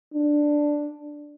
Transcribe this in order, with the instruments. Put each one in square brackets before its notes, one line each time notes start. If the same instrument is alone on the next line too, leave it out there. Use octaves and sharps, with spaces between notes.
[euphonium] D4